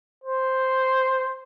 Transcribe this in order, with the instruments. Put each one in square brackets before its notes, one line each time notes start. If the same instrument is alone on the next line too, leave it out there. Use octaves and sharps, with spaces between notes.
[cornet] C5